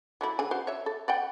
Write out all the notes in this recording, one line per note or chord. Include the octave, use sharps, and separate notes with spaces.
F#3 A3 E4
D3 G#4 G#5
F#4 C5
C#5 E5
A4
D5 F#5 G5